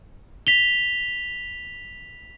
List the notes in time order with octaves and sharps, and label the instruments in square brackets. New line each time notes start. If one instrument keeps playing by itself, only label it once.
[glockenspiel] B6 F7 G7